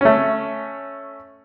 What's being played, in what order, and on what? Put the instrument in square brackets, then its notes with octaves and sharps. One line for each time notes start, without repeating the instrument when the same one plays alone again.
[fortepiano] A3 C#4